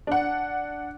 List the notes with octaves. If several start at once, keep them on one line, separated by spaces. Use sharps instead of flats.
D4 F#5